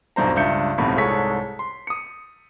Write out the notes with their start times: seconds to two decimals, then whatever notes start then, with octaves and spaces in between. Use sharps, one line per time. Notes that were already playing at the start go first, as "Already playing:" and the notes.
0.16 E1 B1 G2 C5 A#5
0.36 C#2 G2 E5 G6 C#7
0.78 D#1 G#1 F2 A2 C3 B5
0.96 C2 G#2 G#4 A4 C#5 B6
1.59 C6
1.87 D#6 C#7